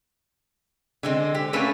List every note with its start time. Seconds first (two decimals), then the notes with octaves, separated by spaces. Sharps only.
1.03 D3 G#3 C4
1.35 G4
1.53 A3 A#3 C#4 A4 B4